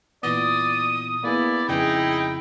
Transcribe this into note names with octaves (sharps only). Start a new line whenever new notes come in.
A#2 E3 B3 D5 D#6
A#3 B3 E4 G#4 D5
F2 C#3 D#4 E4 G#4 G5